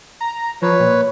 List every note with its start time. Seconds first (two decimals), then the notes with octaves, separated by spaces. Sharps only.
0.21 A#5
0.62 F3 B4 C#5
0.80 A#2